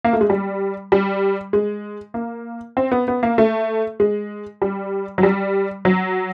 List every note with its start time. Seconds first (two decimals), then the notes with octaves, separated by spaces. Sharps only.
0.05 A#3
0.13 A3
0.21 G#3
0.30 G3
0.92 G3
1.53 G#3
2.14 A#3
2.77 C4
2.92 B3
3.08 B3
3.23 A#3
3.38 A3
4.00 G#3
4.62 G3
5.18 F#3
5.23 G3
5.85 F#3